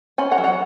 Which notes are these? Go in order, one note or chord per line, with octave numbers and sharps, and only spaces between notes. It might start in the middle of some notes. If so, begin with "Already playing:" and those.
C#4 G#5 B5
F#5 A#5
F#3
F#5 A#5